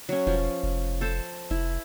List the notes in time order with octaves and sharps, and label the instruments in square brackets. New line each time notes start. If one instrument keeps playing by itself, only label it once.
[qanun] F#3 C#4
[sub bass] E1 [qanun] F3
[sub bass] F1
[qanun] A4 C5 A5
[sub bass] F1 [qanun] E4